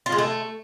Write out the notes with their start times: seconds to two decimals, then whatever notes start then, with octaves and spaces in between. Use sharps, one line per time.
0.06 F4
0.12 G#3
0.18 A3